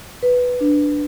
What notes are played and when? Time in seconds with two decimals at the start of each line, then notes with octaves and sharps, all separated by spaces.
0.23 B4
0.61 D4